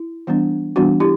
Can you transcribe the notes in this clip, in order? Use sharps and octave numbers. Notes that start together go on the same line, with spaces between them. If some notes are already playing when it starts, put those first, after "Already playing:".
Already playing: E4
E3 G3 B3 D4
E3 G3 B3 D4 F#4
E4 G4